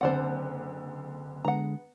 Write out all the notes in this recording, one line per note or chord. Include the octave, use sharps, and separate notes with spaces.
F#1 D3 C4 C5 D5 F#5
D3 G#3 B3 F#5 A#5